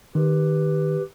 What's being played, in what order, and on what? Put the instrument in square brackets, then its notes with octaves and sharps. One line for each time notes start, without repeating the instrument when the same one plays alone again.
[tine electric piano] D#3 [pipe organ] G4 B4